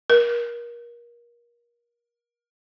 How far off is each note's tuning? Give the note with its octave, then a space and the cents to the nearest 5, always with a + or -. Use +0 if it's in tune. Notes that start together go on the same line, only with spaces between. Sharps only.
A#4 +30